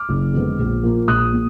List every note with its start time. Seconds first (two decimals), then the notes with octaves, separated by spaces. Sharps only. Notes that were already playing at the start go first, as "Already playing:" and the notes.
Already playing: D6 F6
0.09 F#1
0.34 F2 D3 G#3 B3
0.59 A#1
0.83 A#2 F3 A#3
1.08 A#1 D#6 F#6
1.33 A#2